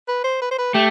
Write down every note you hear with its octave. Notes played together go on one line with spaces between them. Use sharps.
B4
C5
B4
C5
B4
A3 G4